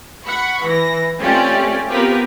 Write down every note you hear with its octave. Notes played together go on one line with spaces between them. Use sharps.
F#5 B5 C#6
E3 A#6
A3 C4 C#4 F4 G4 D5
B3 C4 F4 G4 A#4 B4